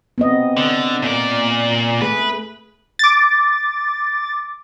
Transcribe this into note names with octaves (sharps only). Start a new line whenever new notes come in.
B3 C4 D#5
D3
A#2 D5
A3 G#4 B4
D6 A6